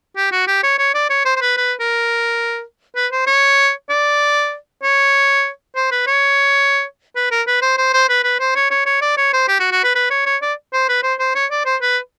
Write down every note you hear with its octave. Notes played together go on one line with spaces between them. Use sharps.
G4
F#4
G4
C#5
C#5
D5
C#5
C5
C5
B4
B4
A#4
B4
C5
C#5
D5
C#5
C5
B4
C#5
B4
A#4
B4
C5
C5
C5
B4
B4
C5
C#5
C#5
C#5
D5
C#5
C5
G4
F#4
F#4
B4
B4
C#5
C#5
D5
C5
B4
C5
C5
C#5
D5
C5
B4